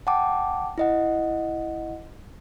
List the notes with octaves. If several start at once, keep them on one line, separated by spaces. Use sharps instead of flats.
F#5 G5 A5 D6
E4 D#5 F#5